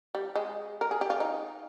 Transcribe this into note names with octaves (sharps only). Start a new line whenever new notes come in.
G3
G#3
A#4
G#4
G4
F4
D#4